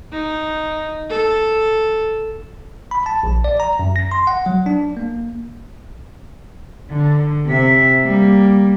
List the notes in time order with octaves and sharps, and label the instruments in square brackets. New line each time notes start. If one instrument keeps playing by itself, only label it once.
[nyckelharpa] D#4
A4
[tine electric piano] B5
A5
A#1
D5
A#5
F#2
A#6
C6
F#5
F#3
D4
A#3
[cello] D3
C3 E5
G3 A#3